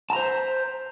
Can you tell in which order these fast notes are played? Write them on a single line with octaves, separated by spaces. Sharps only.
A5 A#5 C5